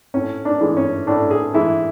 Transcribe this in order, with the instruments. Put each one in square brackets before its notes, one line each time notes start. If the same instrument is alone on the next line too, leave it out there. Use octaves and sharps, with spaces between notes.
[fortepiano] A2 C#4
D4
E3 G#3
C#4
A2 D4
G#4
E3 G#3 E4